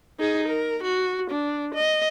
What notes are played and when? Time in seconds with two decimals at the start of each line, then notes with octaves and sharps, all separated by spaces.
0.20 D#4 G#4
0.49 A#4
0.84 F#4
1.31 D4
1.75 D#5